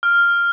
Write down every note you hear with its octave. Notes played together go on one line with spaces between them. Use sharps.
F6